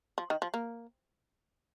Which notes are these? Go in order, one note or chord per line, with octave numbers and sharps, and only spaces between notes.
F3
D#3
F3
A#3